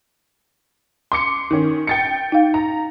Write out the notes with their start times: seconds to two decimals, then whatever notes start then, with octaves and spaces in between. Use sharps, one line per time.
1.12 C6 D6 C#7
1.51 D#3 C#4
1.87 G5 A6 C#7
2.32 D#4 F5
2.54 A#5